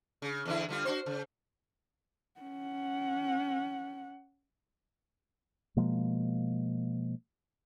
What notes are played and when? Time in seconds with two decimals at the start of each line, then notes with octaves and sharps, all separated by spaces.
0.22 C#3
0.45 E2 D3 E4
0.69 D3 G3 F4
0.85 D4 F#4 C5
1.06 C#3
2.40 C#4 F#5
5.77 B2 F3 G#3 A#3